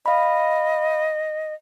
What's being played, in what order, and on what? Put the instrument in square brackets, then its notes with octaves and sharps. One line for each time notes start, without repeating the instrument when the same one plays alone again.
[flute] D#5 [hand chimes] F5 B5